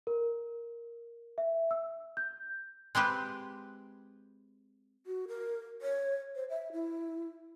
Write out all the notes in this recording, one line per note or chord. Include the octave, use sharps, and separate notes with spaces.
A#4
E5
E6
G6
G#3 C4 G4 B4
F#4
A#4
C#5
C5
E5
E4